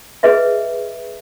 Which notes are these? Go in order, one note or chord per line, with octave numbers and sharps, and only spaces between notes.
G#4 B4 D#5 E5